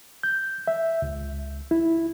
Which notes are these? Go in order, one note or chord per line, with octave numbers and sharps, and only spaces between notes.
G6
E5
C#2
E4